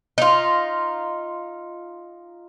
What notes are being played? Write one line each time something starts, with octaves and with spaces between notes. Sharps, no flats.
D#4 F4